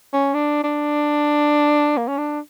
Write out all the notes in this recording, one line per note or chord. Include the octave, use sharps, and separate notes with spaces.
C#4
D4
D4
A#3
C#4
D4